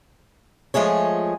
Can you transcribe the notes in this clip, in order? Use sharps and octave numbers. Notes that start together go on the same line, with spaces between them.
F3 G#3 A3 G#4 C#5